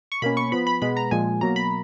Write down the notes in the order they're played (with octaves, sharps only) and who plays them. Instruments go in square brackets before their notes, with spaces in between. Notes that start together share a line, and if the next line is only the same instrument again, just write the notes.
[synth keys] C#6
B2 A#3 C#4 B5
C#6
F3 B3 B5
B5
B2 G#3 B3 B5
A#5
A#2 F3 G#3 G#5
B2 F#3 A#3 A#5
B5